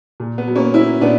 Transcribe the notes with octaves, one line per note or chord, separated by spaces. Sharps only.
A#2
B3
F#3
A#3 C#4
F#3 C#4 E4
A#2 B3 D4